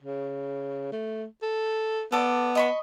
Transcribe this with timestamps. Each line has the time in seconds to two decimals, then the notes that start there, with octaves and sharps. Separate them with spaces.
0.02 C#3
0.93 A3
1.42 A4
2.12 B3 A4 D5
2.55 D#5 B5 C#6